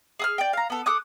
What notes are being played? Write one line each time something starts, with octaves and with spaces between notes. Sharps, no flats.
G#4 D#6 F6
D5 G5
F5 A#5
B3 A4
A4 D6 D#6 F#6